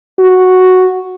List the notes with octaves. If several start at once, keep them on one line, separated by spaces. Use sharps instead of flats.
F#4